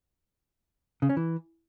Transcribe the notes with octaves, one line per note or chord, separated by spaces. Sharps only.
C#3
C#4
E3